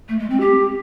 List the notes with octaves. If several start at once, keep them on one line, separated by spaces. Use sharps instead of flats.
A3
G#3
C4
G4